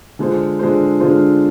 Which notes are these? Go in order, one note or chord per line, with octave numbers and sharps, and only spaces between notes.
D3 G#3 D4 F4 C5
D3 G#3 D4 F4 C5
D3 G#3 D4 F4 C5